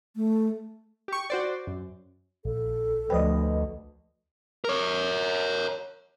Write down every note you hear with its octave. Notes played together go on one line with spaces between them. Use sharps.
A3
G4 C#6
F#4 C5 D5
F#2
A#1 A4
D2 F3 B4 C5 D#5 G5
A#4 C#5